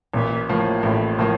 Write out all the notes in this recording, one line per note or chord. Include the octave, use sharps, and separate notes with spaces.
A1 A#2
A2 F3 A#3
A1 A2
A2 F3 A#3